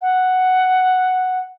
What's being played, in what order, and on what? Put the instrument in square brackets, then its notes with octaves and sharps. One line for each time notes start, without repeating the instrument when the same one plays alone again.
[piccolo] F#5